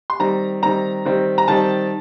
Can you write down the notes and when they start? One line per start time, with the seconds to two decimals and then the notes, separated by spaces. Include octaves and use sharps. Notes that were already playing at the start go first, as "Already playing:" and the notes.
0.10 C6
0.20 D#3 G3 C4 A#5
0.62 D#3 G3 C4 A#5
1.06 D#3 G3 C4
1.38 A#5
1.48 D#3 G3 C4 A5